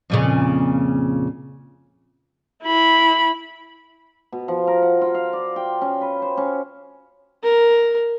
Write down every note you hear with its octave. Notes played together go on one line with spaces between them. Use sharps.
F2 A#2 C#3
E4 B5
B2
F3
A#4
F#5
F4
F5
D5
G5
C#4
B4
C5
C#4
A#4